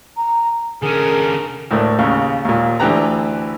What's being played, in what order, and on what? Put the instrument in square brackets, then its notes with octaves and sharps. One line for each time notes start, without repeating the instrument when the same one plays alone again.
[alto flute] A#5
[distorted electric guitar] D3 C#4 [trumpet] G#4 [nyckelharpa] A#4
[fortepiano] D2 A2 A#3
D#2 C#3
D#2 A#2
D2 D3 E3 G4 B4 A#5